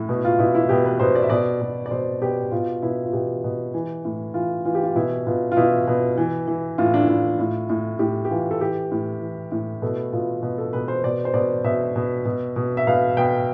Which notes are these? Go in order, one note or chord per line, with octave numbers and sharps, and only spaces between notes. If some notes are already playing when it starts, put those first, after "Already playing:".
Already playing: A2
B2
F4
B2 E4
E4
B2 G4
B4
B2 C5
D5
E5
B2 D5
B2
D5
B2 C5
B2 G4
B2 F4
B2 E4
F4
B2 G4
B2
E3
A2
E3 F4
E3 F4
G4
F4
B2 E4
B2 F4
F4
B2 E4
B2
E3
E3
A2 F4
D4
E4
A2 F4
A2
A2
A2 G4
G4
E3 F4
A4
E3 G4
A2
E3
A2
B2 A4
B2 F4
B2
A4
B2 B4
C5
B2 D5
C5
B2 D5
B2 E5
B2
B2
B2
E5
B2 F5
B2 G5